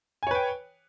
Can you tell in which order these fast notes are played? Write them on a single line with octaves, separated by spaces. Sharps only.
G#5 C#5 B4 G5